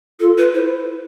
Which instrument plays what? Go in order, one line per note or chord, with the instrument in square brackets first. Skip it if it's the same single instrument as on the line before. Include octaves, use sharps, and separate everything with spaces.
[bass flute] F4 [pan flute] A4
[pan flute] B4
[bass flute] E4 [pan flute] C5